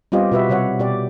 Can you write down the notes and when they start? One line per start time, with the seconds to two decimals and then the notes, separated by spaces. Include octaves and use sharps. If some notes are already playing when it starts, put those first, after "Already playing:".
0.12 G3 B3 C4 F4 G4 D#5
0.32 B2 F#4 B4 E5
0.49 C3 G3 C#5 F#5
0.79 B2 G4 D5